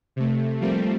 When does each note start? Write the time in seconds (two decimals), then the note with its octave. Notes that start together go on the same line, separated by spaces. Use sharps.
0.16 C3 A3
0.61 F3 G3 A3 A#3 C4